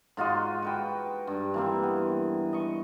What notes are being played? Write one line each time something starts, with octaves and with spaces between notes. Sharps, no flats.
G#2 F4 F#4 D#5
F#4 B4 G5
G2
E3 A#3 C4
B3
D#5 C#6